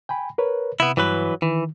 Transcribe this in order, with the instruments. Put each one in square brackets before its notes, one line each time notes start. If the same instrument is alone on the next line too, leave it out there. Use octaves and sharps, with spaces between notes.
[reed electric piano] G5 G#5 B5
A#4 B4 C#5
[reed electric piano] C3 [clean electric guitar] B3 E4
[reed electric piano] G2 [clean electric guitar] E3 F#3 B4
[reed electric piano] D#3 [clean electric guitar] E3